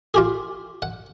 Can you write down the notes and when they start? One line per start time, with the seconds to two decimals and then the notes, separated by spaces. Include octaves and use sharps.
0.14 F4 G4 G#4
0.82 F#5